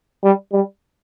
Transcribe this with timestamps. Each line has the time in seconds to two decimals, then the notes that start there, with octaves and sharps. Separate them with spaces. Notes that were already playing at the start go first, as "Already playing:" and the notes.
0.23 G3
0.52 G3